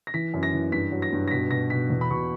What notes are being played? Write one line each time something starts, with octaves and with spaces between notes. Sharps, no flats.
A#6
E3 B6
F#2
A#6
E3
G2 B6
F#3
A#6
G2
A#6
B2 B6
B2 A#6
B2 B6
E2
B5
B2 C#6